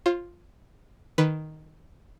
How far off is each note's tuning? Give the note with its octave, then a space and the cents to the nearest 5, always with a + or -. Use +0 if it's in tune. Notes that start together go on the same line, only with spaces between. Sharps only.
F4 +0 C5 +40
D#3 +0 B4 +0